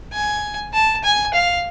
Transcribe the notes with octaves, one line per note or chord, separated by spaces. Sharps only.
G#5
A5
G#5
F5